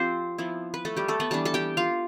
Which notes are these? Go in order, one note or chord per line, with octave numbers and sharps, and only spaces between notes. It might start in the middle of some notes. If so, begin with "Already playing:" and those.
Already playing: F3 C4 F4 G4 C5 F5
F3 B3 E4
B4
A3 A4
G3 G4
A3 A4
B3 B4
E3 G3 B3 D4 A5
A4 A5
G4 G5
F4 F5